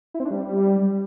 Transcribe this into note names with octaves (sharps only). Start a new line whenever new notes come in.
E4
C4
D4
G3